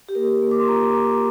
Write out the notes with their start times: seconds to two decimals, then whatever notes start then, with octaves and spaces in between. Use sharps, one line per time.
0.09 G4
0.15 A#3 A#4
0.42 A#3
0.51 D6
0.60 C6
0.68 F4 A#5